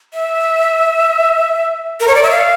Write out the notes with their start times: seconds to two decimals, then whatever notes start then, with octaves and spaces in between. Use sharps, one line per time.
0.13 E5
2.00 A#4
2.08 C#5
2.15 D5
2.23 E5
2.30 F5